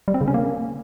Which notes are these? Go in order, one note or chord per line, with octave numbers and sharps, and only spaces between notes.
G3
C4
C#3
C#4
A#3